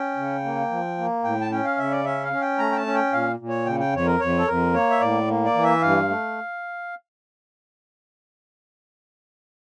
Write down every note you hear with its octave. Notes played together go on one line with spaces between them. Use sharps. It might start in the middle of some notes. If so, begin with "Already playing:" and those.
Already playing: C#4 G5
C#3
A#3
F3
A#3
A2 G5
A5
C#4 G5
F5
C#3 E5
D5
C#4 E5
F5
C#4
G5
A3 A#5
G5
A5
C#4
G5
A#2 F5
A#2
C#5
C#3 G5
G5
F2 C#5
A#4
F2 C#5
A4
F2 A#4
A#3 C#5
E5
A2 D5
A#3
D5
E3
E5
G2 F5
A3